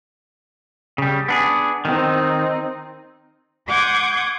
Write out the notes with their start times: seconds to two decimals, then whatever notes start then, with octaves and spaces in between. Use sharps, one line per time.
0.98 C#3 G3
1.28 B3 D4 G#4
1.85 D#3 C4 D#4
3.68 F#5 C6 D6 D#6 G6 G#6